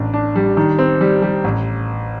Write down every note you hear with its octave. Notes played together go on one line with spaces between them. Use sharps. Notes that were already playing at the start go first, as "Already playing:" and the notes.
Already playing: A1 D4
D4
G3
D#3
C4
G3
G3
A1